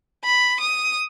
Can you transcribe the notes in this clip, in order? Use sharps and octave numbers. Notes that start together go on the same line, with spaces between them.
B5
D#6